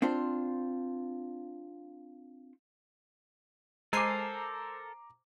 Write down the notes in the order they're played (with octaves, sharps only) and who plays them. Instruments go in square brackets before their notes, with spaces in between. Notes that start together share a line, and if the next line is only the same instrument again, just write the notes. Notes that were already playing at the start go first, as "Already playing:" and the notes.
[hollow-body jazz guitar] C4 D4 F4 C5
[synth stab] G#3 G#5 C7 [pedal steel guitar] A4 A#4 [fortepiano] C5 [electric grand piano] A#5 D6